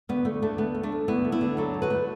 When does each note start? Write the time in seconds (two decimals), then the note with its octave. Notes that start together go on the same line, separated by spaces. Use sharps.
0.09 D2 B3
0.25 D2 A3
0.42 D3 A3
0.58 A3 B3
0.75 D2
0.83 A3 D4
0.92 D2
1.08 D2 B3 E4
1.24 A3
1.32 B3 E4
1.41 D3
1.57 F#3 E4 A4
1.74 D2
1.82 F#4 B4
1.90 A3